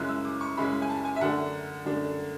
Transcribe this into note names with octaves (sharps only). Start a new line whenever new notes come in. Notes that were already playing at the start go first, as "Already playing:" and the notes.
Already playing: F#2 C#3 G#3 C#4 E4 F#6
E6
D6
C#6
F#2 C#3 G#3 C#4 E4 B5
G#5
A5
G#5
E5
F#2 D3 A3 D4 F#5
F#2 D3 A3 D4